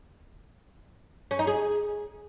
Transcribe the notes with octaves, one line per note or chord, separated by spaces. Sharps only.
C#4
D#4
G#4